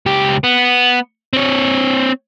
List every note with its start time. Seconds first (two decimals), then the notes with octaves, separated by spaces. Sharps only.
0.06 C#2 G4
0.44 B3
1.33 C4 C#5